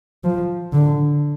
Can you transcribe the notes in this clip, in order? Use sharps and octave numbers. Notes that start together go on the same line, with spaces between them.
F3
D3